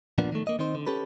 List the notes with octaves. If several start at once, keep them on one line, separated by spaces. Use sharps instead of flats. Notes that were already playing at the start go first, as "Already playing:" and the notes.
A#2 F3 A#3 B3 D4
D#3 A3
A#3 D#5
D#3 C4 D#4 C5
D3
C#4 G4 A4 B4